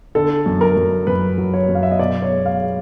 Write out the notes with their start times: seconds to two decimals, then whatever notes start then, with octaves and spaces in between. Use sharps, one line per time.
0.15 D3 A4
0.46 F#2
0.61 A#4
0.77 F#2
1.07 F#2 B4
1.38 F#3
1.54 C#5
1.69 F#2
1.75 F5
1.83 E5
1.91 D#5
1.99 B2 D5
2.22 C#5
2.30 G#3
2.46 F5
2.60 G#3